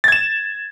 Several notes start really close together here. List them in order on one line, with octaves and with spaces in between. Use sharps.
A6 G#6 E7